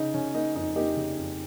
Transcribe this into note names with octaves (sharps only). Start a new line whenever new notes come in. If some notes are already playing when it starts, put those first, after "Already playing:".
Already playing: C#3 D#4
C#3 C#4
A#3 D#4
F2 D#4
A#3 D#4 G4
C#3
F2